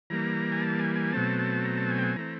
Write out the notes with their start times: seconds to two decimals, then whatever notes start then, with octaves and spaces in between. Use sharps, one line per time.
0.10 E3 G3 A#3 A#5
0.52 G#5
0.62 A5
0.79 G#5
0.96 G#5
1.13 B2 F#3 A3 C4 A5
1.39 A5
1.65 A#5
1.77 A5
1.90 G#5
1.98 G5
2.03 G#5
2.16 E3 A3 C4 A#5